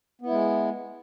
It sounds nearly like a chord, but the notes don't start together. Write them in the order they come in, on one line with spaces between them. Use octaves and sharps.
B3 E4 G#3